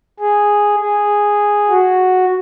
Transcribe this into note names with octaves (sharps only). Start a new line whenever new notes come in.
G#4
G#4
F#4